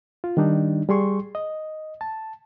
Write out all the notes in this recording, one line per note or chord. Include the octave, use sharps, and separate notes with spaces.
F4
D#3 G3 D4 D#4
G3 G#4 C6 C#6
D#5
A5